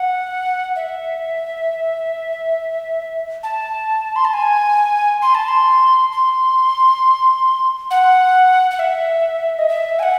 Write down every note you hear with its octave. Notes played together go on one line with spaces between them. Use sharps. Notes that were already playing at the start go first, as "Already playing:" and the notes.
Already playing: F#5
E5
A5
C6
A5
G#5
C6
A5
C6
C6
F#5
F#5
E5
D#5
E5
G#5
F#5